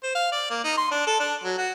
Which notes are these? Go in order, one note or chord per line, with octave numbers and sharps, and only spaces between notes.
C5
F5
D5
A#3
D#4
C6
D4
A4
D4
F#3
F#4